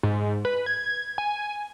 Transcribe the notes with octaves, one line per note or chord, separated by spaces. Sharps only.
G#2
B4
G#6
G#5